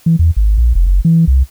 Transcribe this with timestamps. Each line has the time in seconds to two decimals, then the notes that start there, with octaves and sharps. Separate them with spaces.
0.06 E3
0.19 E2
0.36 G#1
0.58 A#1
0.75 F1
0.87 F#1
1.05 E3
1.27 C2